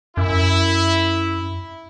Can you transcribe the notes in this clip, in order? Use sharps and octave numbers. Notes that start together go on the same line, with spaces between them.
F#2 E4